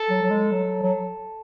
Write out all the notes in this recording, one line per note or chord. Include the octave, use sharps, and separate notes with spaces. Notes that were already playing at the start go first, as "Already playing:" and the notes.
Already playing: A4
F#3
F#3
G#3
F#3
F#3